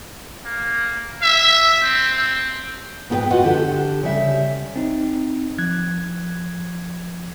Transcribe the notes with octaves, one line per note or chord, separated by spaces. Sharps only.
A#3
E5
C4
G#2 B3 F4 A4 B4 G5
F4 F#4 B4 D#5 F#5
D3 G4 A4
C#3 G3 E5
C4 D#4
F3 F#6 G#6